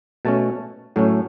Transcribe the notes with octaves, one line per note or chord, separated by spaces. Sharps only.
B2 A3 C#4 A5
A2 F#3 A3 C#4